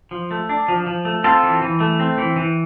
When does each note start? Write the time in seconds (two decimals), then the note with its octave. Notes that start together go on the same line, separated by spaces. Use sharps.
0.11 F3
0.31 A3
0.49 D4
0.68 F3
0.87 F3
1.05 A3
1.24 C4 F4 A4
1.43 E3
1.62 E3
1.80 A3
2.00 C4
2.18 E3
2.36 E3